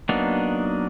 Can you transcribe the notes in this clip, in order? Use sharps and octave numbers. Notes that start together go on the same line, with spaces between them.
F#3 A#3 B3 D4 D#4